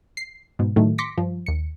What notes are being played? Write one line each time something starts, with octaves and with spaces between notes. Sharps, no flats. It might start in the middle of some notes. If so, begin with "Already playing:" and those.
C7
G#2 B2
A2 D#3 F#3 A3
C6 D6 A#6 B6 C#7
G2 F3
D#2 C#7